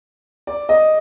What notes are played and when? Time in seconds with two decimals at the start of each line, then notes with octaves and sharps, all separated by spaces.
0.47 D5
0.69 D#5